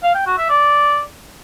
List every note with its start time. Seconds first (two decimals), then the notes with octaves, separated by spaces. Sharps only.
0.03 F5
0.15 G5
0.26 F#4
0.38 E5
0.49 D5